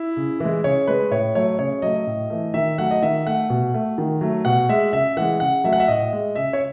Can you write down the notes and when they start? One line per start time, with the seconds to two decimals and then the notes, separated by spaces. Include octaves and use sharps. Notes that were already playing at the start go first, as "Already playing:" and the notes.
Already playing: E4
0.17 C#3
0.40 E3 G#3
0.64 C#3 C#5
0.88 G#3 B4
1.11 A2 C#5
1.35 F#3 A3 C#5
1.59 C#3 C#5
1.82 F#3 A3 D#5
2.07 A2
2.30 E3 A3
2.54 D#3 E5
2.78 F#3 A3 F#5
2.91 D#5
3.02 D#3 E5
3.26 A3 F#5
3.50 B2
3.74 A3
3.98 D#3
4.21 F#3 A3
4.45 B2 F#5
4.69 G#3 E5
4.93 C#3 E5
5.17 E3 G#3 F#5
5.40 C#3 F#5
5.64 F#3 A3 E5
5.73 F#5
5.80 E5
5.88 A2 D#5
6.13 G#3
6.35 C#3 E5
6.53 C#5